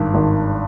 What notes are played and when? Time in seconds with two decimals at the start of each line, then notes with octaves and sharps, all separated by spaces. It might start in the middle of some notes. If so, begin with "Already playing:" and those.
Already playing: G#1 G2
0.14 G#1